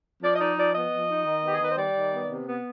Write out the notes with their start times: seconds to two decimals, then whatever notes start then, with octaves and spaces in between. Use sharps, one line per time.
0.22 F3 D5
0.34 D#5
0.40 D#4 D5
0.57 F3 D5
0.74 B3 D#5
0.91 F3
1.08 D#4
1.25 D#3
1.43 B3 G4
1.53 G#4
1.61 D#3 B4
1.70 C5
1.77 G3 D5
1.95 D#3
2.12 B3
2.30 C3
2.46 B3